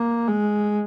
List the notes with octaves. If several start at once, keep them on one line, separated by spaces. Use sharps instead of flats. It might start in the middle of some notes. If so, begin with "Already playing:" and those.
Already playing: A#3
G#3